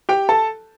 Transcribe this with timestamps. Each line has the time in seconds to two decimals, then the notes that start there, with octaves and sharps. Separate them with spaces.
0.09 G4 G5
0.29 A4 A5